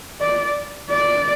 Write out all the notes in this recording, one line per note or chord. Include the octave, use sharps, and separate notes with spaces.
D5
D5